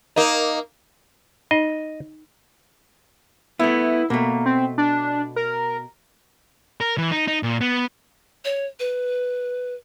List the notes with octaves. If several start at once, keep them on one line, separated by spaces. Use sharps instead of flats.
A#3 D#4
D#4 D#5
A3 B3 E4
B2 A3 A#3
C4
D4
A#4
A#4
E3
D#4
D#4
A#2
B3
C#5
B4